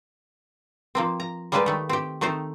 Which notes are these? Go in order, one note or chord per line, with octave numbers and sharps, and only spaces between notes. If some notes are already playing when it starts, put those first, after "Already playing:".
F3 A#3 C4
A#5
G3 G#3 A#3 G4 B4 A5
D#3 A3
C4 G4
D#3 A3 C4 D#4 C5